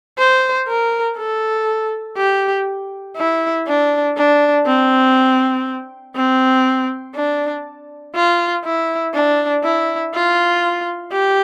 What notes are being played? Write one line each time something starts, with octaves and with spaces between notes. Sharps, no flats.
C5
A#4
A4
G4
E4
D4
D4
C4
C4
D4
F4
E4
D4
E4
F4
G4